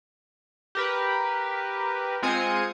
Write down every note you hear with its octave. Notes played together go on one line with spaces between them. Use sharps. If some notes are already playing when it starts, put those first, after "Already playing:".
G4 A#4 B4
G#3 C4 F4 G#5 D#6 C#7